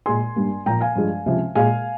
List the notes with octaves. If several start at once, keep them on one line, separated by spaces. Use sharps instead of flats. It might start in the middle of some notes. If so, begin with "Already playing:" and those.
A#2 G#3 G#5 C6
G2 G3 A#3
A#2 F3 A#3 G5 A#5
F5 G#5
G2 F3 G#3
C#2 C3 F3
A#2 G#3 F5 G#5